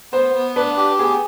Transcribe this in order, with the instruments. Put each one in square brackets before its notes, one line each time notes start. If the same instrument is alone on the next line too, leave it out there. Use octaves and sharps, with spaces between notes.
[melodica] B3 [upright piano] C5
[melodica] B3
[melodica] D4 [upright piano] B4
[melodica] G4
[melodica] B3 [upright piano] G#4